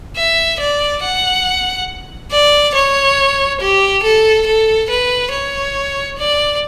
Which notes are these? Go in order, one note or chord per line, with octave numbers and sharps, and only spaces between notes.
E5
D5
F#5
D5
C#5
G4
A4
A4
B4
C#5
D5